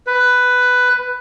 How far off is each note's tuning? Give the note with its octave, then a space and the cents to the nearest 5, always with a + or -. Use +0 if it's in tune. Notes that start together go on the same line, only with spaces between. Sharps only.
B4 +10